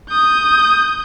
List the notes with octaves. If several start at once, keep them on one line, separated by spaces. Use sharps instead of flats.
D#6 G6